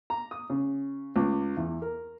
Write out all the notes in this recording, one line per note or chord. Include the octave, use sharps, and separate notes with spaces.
A#5
D#6
C#3
C#2
E2
A#4